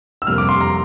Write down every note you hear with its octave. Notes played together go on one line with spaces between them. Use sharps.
E6
F2 C3 G3 A#3 F6
D6
C6
A#5